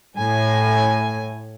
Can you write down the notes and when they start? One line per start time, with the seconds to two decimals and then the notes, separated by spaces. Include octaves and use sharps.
0.18 A2 G#5